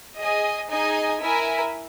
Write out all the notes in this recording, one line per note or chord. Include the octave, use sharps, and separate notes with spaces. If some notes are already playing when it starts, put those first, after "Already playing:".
G#4 D#5 G#5
D#4 G#4 D#5 G#5
E4 A#4 E5 G#5